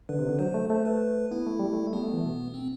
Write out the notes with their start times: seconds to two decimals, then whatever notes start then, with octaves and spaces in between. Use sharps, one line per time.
0.09 D3 B4
0.19 C3
0.29 D3
0.39 F#3 C5
0.54 A3
0.69 A3 C5
0.85 B4
1.31 B3 E4
1.47 A3
1.59 G3
1.73 A3
1.87 A3
1.93 G3 B3
2.03 A3
2.13 E3
2.24 B2
2.54 C4